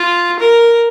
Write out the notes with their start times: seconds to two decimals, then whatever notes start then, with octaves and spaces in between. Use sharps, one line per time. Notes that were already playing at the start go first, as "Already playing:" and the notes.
Already playing: F4
0.39 A#4